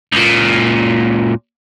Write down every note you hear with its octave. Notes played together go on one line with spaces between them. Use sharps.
C#2 A#2